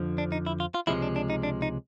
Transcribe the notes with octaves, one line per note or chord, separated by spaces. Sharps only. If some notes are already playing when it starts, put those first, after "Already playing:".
Already playing: F2 D3 F3
D4
D#4
E4
F4
F4
C#2 C3 F3 G#3 E4
D4
D4
D#4
D4
D#4